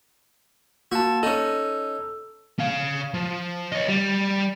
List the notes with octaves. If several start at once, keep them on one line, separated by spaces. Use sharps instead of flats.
A#3 F#4 A5
C#4 D#4 A4
C#4 F5
F3
C#5 D#5
G3